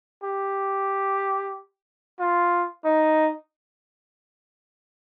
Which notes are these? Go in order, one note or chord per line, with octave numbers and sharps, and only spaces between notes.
G4
F4
D#4